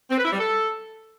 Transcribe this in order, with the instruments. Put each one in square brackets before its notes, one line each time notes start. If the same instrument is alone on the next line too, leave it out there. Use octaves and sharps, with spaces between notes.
[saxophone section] C4
B4
E4
G3
A4